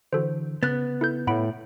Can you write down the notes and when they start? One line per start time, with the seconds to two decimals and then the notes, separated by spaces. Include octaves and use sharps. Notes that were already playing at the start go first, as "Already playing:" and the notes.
0.13 D3 E3 F#4 A4 C5
0.63 C#3 B3 F#6 A6
1.01 E4 A4 G6
1.27 A2 F#5 B5 D7